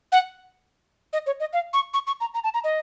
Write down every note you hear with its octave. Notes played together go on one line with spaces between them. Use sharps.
F#5
D#5
C#5
D#5
F5
C#6
C#6
C#6
A#5
A#5
A5
A#5
D#5